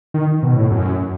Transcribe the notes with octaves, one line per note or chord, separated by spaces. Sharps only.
D#3
B2
A2
F#2